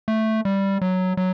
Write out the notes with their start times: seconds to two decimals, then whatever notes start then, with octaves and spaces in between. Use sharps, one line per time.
0.08 A3
0.45 G3
0.81 F#3
1.17 F#3